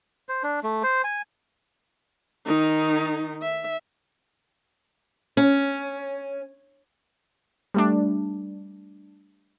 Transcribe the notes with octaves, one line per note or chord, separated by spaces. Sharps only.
C5
D4
A3
C5
G#5
D#3 D#4
E5
C#4
G3 A3 D4